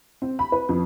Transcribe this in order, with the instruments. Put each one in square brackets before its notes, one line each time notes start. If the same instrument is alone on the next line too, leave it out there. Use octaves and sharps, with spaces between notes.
[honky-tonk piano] C4
B5
B4
F2